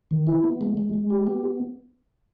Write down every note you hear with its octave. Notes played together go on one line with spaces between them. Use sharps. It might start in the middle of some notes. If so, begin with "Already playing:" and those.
D#3
E4
B3
G#3
G#3
G#3
G4
B3